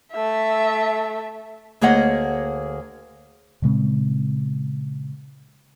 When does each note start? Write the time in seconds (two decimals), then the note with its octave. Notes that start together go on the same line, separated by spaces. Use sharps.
0.12 A3 E5
1.81 D2 A#3 G#4 C#5 D#5 F#5
3.62 A#2 C#3 G#3 C4